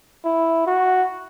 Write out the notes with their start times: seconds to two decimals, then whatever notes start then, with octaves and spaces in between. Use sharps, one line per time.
0.24 E4
0.67 F#4